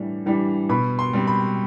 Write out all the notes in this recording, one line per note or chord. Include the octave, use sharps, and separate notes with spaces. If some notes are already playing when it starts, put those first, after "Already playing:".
Already playing: A2 E3 G3 D4
E3 G3 D4
B2 B5
C6
G3 C4
B5